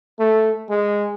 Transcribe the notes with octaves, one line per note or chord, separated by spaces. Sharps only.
A3
G#3